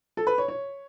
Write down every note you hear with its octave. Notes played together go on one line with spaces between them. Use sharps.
A4
B4
C#5
C#5